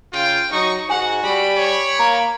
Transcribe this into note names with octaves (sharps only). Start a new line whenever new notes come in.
C#3 F4 G5
F#3 D#4 C#6
G#2 F#4 F#5 G#5
G3 B5 D6
C#5
A#3 A#5